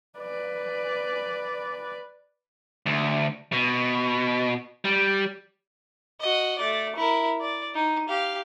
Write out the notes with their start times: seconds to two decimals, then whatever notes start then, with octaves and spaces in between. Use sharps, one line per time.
0.19 B4 D5
2.86 D2
3.53 B2
4.85 G3
6.21 F#4 D#5
6.59 A3 D5
6.96 E4 A#4
7.41 D5
7.74 D#4
8.09 G4 F5